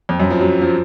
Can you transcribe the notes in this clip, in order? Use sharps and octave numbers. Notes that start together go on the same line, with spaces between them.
F2
F#2
F3
F#3
F3